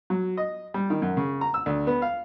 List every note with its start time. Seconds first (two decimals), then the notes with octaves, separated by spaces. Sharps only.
0.10 F#3
0.37 D#5
0.74 G3
0.90 D#3
1.02 F#2
1.17 C#3
1.41 A#5
1.54 E6
1.66 D2
1.87 B3
2.02 F5